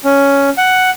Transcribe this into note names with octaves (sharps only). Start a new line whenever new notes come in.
C#4
F#5